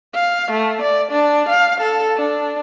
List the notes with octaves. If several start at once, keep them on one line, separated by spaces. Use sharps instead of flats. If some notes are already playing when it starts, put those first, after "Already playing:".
F5
A3
D5
D4
F5
A4
D4